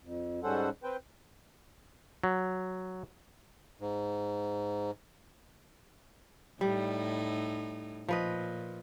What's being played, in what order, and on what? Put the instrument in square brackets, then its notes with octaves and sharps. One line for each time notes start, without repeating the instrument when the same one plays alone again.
[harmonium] F2
G#2 G3 C#4 A4 C5 F#5
C4 B4 C5 G5
[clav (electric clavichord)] F#3
[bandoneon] G#2
[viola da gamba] A2 D#4 [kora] G3
[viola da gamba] A#2 [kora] F3 B4 D#5